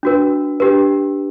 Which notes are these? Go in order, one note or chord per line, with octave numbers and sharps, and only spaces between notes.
D4 F#4 B4
D4 G4 B4